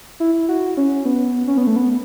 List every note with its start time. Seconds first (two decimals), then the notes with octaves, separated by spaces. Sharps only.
0.20 E4
0.49 F#4
0.77 C#4
1.05 B3
1.48 C#4
1.57 B3
1.67 A3
1.76 B3